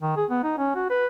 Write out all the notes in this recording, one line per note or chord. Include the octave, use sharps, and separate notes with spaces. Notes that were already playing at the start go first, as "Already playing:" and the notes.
D#3
G#4
B3
D#4
C#4
F#4
B4